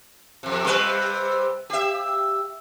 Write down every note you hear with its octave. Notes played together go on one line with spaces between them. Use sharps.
F2 C3
C3 G3 B4
G4 E5